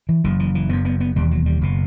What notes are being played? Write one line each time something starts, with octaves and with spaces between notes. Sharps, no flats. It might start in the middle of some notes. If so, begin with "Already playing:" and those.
E3
F#1 F#2 E3
E3
E3
F#1 F#2 B3
B3
B3
E1 D#2 G3
F#3
G3
F#1 B2